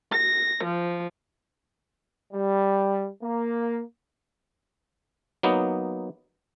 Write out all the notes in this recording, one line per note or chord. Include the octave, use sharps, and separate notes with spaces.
A#6
F3
G3
A#3
F#3 A#3 B3 D#4